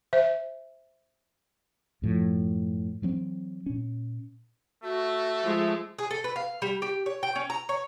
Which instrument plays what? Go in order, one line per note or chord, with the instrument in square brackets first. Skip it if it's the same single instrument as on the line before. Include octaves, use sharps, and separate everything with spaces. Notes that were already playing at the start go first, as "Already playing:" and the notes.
[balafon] C5 E5
[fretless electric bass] F#2 A2 F3
E3 F#3 A#3 C4
A#2 C#4
[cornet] A3 [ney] F#4
[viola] F3 G#3
[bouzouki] G#4
A4
B4
F5
G3
G4
C#5
G5
C#4
A#5
C#5